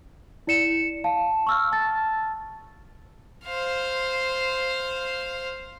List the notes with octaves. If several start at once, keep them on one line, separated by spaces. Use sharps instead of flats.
E4 D5 C#7 E7
F5 A5
C#6 E6 F6
A5 A6
C5 F5